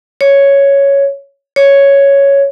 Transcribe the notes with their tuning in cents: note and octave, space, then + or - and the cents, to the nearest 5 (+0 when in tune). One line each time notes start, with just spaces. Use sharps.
C#5 +5
C#5 +5